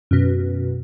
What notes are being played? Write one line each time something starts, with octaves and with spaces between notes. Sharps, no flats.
F#2 B2